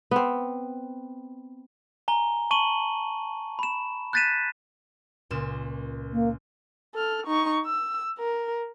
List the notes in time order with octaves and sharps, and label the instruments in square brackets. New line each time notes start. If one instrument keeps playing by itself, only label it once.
[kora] B3 C4
[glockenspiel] G#5 A#5 G7
A5 C#6 D#7 F#7 G7
B5 E7
F#6 G6 A6 B6 D#7 E7
[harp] C#2 A#2 E7
[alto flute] A#3
[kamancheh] A4 F6
D#4 C#6
E6
A#4